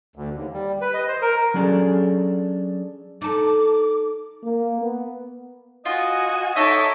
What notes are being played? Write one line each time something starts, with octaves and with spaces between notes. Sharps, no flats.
D2
D#2
G3
B4
D#5
C5
A#4
F#3 C#4 D4 G#4 A4
D#4 A4 D6
A#3
B3
F4 F#4 D#5 G#5
D#4 A4 C#5 D#5 E5 D6